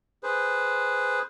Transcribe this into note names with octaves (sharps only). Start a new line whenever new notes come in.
G#4 B4 C5